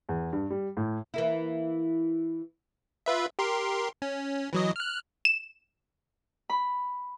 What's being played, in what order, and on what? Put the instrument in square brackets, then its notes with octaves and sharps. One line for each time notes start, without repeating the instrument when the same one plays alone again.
[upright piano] E2
G2
G3
A2
[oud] E3 A#3 E4
[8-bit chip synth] F4 B4 E5
G4 A#4 C6
C#4
E3 F#3 D#5
F6 F#6
[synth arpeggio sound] E7
[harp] B5